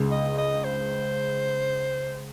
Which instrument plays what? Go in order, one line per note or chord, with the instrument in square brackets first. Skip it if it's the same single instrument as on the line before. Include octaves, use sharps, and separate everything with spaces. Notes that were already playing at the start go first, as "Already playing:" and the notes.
Already playing: [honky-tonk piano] C#2 C#3
[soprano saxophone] D#5
D#5
C5